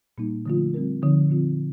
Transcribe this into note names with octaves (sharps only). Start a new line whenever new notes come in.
A#2 G3 A#3 D#4
D3 F3 A3 D4 F4
G3 C4 F4 A#4
D3 F3 C4 D#4
A#2 F3 C4 F4